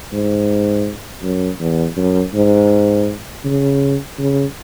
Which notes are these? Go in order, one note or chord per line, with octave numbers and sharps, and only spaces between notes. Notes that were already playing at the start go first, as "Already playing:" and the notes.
G#2
F#2
E2
F#2
G#2
C#3
C#3